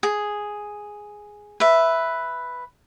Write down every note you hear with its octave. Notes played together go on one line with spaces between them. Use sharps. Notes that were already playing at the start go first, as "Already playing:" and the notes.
G#4
B4 E5